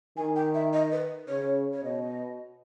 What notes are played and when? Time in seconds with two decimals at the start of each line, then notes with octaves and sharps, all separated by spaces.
0.17 D#3 G#5
0.36 G5
0.54 E5
0.73 D#5
0.92 B4
1.28 C#3 C#5
1.73 C#5
1.84 B2 D#5